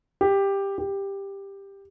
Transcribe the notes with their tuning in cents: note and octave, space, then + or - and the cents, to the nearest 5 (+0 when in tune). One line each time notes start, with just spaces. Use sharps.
G4 +10
G4 +10